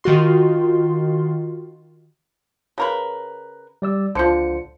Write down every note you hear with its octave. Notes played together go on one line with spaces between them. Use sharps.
D#3 F4 F#4 C6
C#3 A#4 B4
G3 D5 E6
C#2 D3 F3 C5 C#7